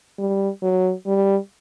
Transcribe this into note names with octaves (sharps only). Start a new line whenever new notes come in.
G3
F#3
G3